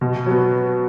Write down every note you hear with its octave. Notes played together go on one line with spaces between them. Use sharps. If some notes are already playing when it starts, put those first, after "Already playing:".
B2
F#3 B3